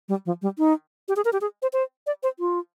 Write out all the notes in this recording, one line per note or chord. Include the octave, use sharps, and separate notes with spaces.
G3
F3
G3
D#4
G4
G#4
A#4
G4
G#4
C5
C5
D5
C5
F4